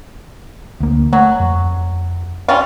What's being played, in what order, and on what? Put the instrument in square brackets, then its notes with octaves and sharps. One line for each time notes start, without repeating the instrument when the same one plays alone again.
[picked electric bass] D2 A#3
[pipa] F#3 [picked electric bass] A3
[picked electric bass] F2
[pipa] G3 C#4 F4